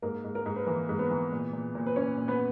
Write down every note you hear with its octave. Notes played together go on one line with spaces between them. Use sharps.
G#2 A#3 A#4
G#2
A#3 A#4
G#2
B4
E3 A#3 A#4
G#2
B3 B4
E3
A#2
A#2
A#2
B4
A#2 C#4 C#5
A#2
B3 B4